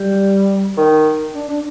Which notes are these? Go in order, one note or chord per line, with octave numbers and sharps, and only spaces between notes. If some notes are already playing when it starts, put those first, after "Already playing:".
Already playing: G3
D#3
D4
D4